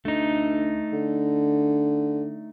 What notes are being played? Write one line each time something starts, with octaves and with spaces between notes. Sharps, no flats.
D2 A3 D#4
D3